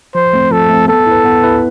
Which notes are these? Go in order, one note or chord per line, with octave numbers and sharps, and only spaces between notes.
F3 C5
A3 C4
F3 A4
A3 C4
B3 A4
E4 B4
B3
E4 B4